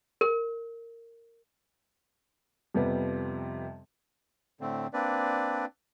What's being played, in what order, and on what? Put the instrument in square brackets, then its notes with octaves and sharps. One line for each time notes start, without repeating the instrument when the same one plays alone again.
[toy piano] A#4
[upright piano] F2 C3 F3 G3 B3
[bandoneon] A2 D3 A3 C4
A#3 C4 D4 B4 D5